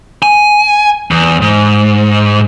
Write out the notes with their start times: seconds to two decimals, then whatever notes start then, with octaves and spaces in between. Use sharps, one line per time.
0.23 G#5
1.11 E2
1.41 G#2